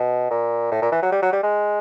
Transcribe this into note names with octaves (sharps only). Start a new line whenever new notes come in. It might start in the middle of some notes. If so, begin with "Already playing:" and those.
Already playing: B2
A#2
A2
A#2
E3
F#3
G3
F#3
G3
G#3